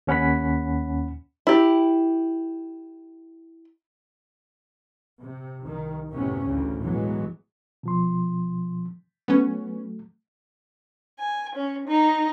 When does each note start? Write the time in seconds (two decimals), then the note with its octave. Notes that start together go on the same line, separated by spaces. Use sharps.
0.07 D#2 C#4 F#5 B5 B6
1.47 E4 G4
5.22 C3
5.63 C2 D#3
6.10 F#2 A2 C3 B3 C#4
6.46 A1 D2 A2 C#3
6.81 B1 A2 E3 F#3 G#3 B3
7.83 B2 F3 C6
9.28 F#3 A3 B3 C#4
11.20 G#5
11.55 C#4
11.87 D#4